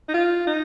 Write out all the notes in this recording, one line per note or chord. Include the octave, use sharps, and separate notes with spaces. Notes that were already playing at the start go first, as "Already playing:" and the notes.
D#4
F4
D#4